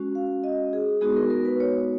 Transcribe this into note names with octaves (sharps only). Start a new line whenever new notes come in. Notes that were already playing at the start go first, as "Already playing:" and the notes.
Already playing: G#3 C#4 F#4
F5
D#5
G#4
G#3 B3 D#4 F#4 G#4
A#4
A#4
B4
C#5